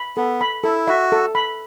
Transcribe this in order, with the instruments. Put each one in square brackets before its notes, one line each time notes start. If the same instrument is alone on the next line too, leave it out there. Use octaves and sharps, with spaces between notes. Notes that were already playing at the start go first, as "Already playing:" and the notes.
Already playing: [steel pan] B5
[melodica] B3 [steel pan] A4
[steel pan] B5
[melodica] E4 [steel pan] A4
[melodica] F#4 [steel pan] E5
[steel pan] A4
B5